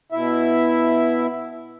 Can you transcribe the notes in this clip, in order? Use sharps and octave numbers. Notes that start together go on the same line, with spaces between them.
B2 E4 E5